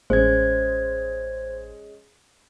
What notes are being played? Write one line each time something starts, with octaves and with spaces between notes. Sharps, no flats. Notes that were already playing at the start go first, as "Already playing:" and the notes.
A1 G#3 C#4 C5 G#6